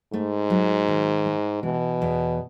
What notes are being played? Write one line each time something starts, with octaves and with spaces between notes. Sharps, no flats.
G#2 A3
F#3
D#3
G#3
B2 E3
E2